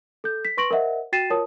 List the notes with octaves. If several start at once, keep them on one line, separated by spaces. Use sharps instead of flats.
A4 G6
B6
B4 C6 C#6 A#6 D7 F#7
A#4 C5 D#5 E5 F#5
F#4 G5 A6 C7 D#7 E7
F4 A#4 C#5 A5 D#6